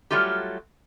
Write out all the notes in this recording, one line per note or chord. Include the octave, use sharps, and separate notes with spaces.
F#3 G3 A3 F4 G4